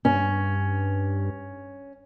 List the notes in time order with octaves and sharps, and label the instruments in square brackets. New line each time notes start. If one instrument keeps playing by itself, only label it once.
[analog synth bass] G2 [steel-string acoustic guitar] C#4